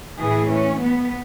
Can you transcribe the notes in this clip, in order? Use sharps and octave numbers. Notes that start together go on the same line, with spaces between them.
A2 E3 G#4
C#4
B3